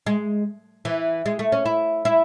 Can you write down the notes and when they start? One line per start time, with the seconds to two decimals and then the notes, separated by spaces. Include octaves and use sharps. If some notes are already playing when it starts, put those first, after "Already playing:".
0.06 G#3
0.85 E3
1.26 G#3
1.39 A3
1.52 C#4
1.66 E4
2.05 E4